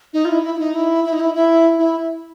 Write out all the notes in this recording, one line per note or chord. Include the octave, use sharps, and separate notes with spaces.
D#4
F4
E4
E4
E4
D#4
E4
E4
D#4
E4
E4
E4